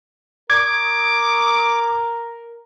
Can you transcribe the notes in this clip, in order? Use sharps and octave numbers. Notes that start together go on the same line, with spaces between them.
A#4 D6 G#6